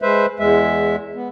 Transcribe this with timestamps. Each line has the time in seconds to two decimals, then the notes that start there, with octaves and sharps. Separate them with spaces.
0.02 G#3 B4 C5 E5
0.39 E2 G#3 E5
1.15 B3